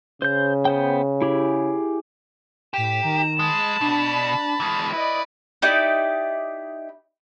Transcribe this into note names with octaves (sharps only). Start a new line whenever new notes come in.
C#3 C5 G6
B3 C5 G5
E4 G4 G#4
A2 G4 B6 E7
D#3 A#5
G#3 A5 B5
B2 D4
E3 G#3
E4 B4 D5 D#5
D#4 E4 G4 D5